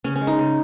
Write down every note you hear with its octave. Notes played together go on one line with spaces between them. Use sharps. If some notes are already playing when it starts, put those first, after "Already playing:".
C#3 C#4
C#4
G#3
D#4
C#3